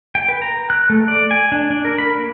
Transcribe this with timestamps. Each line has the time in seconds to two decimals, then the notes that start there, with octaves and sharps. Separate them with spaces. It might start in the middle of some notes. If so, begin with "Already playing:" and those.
0.15 G5
0.29 B4
0.42 A#5
0.70 F#6
0.90 A3
1.08 D5
1.31 G#5
1.52 D4
1.70 D4
1.85 A#4
1.98 B5
2.18 A#3